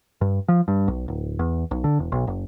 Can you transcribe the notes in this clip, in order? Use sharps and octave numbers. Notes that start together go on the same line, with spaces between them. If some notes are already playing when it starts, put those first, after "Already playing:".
G2
F3
G2
B1
D1
E2
B1
D3
E1
B1
F#1